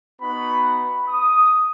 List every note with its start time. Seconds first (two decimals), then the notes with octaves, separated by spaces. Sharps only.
0.21 B3 D#4 F#4 B5
0.64 B5
1.08 D#6